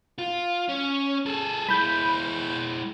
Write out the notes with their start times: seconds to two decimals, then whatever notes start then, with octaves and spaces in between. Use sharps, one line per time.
0.18 F4
0.69 C#4
1.26 G#4 A4
1.69 G#3 E4 B5 G6